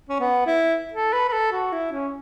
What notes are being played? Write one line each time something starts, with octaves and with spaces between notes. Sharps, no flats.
C#4
B3
E4
A4
B4
B4
A4
F#4
E4
C#4